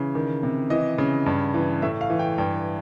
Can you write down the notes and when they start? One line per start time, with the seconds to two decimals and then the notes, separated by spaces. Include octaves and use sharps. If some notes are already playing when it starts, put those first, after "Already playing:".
Already playing: C#3 E3
0.15 D#3
0.43 C3
0.70 E3 D#5
0.98 C#3
1.26 G2
1.54 E3
1.82 A2 E5
2.01 F5
2.10 E3
2.19 G5
2.38 G2 G5